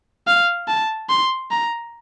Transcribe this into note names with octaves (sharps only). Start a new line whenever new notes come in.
F5
A5
C6
A#5